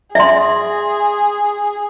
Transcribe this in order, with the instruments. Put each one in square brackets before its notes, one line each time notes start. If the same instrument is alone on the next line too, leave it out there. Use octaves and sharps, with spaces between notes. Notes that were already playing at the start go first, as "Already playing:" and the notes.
[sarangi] G#4 [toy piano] E5 C6